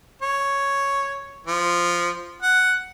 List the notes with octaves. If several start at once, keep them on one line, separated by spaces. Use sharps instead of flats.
C#5
F3
F#5